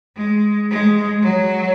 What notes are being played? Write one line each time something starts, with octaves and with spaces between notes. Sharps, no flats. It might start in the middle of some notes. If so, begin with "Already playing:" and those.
G#3
G#3
F#3